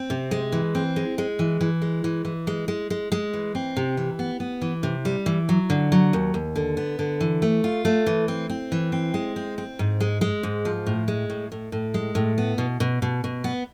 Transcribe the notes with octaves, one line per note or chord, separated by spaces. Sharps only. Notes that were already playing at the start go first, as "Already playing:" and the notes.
Already playing: C4
C3
G#3
E3
C4
G#3
G#3
E3
E3
G#3
E3
E3
G#3
G#3
G#3
G#3
E3
C4
C3
E3
B3
B3
E3
C3
G3
E3
F#3
D3
F#3
D#2
D#2
D3
B3
D3
E3
A3
F4
A3
E3
C4
C4
E3
C4
G#3
C4
C4
G#2
G#3
G#3
G#2
F3
A2
G#3
A2
A2
A2
G#3
A2
B3
B2
B2
B2
B2
B3